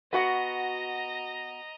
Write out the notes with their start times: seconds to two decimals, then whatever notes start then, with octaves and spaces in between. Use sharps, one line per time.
0.13 B3 F#4 D#5 F#5 A#5